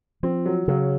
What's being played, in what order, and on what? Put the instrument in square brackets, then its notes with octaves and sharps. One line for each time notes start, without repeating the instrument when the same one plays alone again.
[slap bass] F3 [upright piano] C4
[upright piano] F#3
[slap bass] C#3 [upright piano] F#3